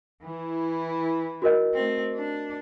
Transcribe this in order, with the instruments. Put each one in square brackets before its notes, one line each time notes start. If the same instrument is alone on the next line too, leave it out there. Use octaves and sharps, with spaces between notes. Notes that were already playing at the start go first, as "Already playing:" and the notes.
[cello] E3 E4
[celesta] F#4 A#4 D#5
[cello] A3 C4
D4